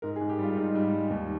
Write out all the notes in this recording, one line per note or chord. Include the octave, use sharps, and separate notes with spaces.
G#2 A#4
G#4
G#2
G4
G3 F4
G#2 D#4
G3
G3
D#2